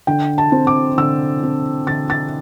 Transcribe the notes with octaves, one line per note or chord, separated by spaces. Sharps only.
D3 G5
A5
C4
D6
D3 E6
C4
D3 A6
A6